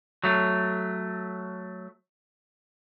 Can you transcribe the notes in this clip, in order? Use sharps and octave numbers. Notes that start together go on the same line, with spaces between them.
F#3 A3